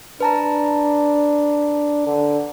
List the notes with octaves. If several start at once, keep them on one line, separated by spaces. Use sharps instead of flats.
D4 B4 A5 A#5
D3